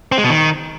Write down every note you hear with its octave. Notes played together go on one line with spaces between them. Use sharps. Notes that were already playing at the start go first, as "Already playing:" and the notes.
C4
G#3
B2
D#3